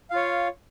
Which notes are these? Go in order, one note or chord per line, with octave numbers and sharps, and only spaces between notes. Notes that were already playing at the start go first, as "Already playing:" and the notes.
F4 C#5 F5